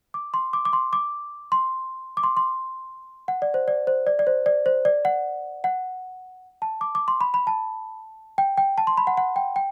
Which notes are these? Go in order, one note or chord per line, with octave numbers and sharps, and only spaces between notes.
D6
C6
D6
D6
C6
D6
C6
D6
C6
C6
F#5
D5
C5
D5
C5
D5
D5
C5
D5
C5
D5
F#5
F#5
A5
D6
D6
C6
B5
B5
A5
G5
G5
A5
C6
B5
F#5
F#5
G5
G5